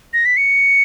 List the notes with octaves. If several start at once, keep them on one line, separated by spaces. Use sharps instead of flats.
A#6
B6
C#7